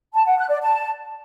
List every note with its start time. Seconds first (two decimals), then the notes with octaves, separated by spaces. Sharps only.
0.14 A5
0.26 F#5
0.38 F#6
0.50 D5
0.62 A5